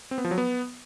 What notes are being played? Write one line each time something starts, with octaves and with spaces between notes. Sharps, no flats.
C4
B3
F3
F#3
B3